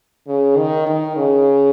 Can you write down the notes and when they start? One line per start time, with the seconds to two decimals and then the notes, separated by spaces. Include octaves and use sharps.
0.27 C#3
0.57 D#3
0.87 D#3
1.16 C#3